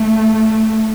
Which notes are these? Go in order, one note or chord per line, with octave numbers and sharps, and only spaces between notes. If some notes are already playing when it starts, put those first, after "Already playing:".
Already playing: A3